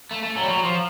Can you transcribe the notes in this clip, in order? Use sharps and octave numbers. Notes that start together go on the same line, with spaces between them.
A3
A3
F#3
G3
F#3
F3